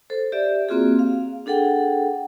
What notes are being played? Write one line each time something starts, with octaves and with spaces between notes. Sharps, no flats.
A4 C5
G4 D5 E5
A#3 C4 F4 F#4 G#4
F5
D4 G#4 A4 F#5 G5